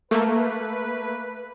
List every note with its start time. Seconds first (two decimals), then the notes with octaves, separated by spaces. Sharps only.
0.11 A3 A#3 B4